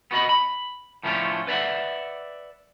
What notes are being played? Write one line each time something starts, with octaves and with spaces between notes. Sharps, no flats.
B3 F#4 D#5 B5
B5
A2 F3 A3 C#4 D4 F4
B4 D5 E5 F#5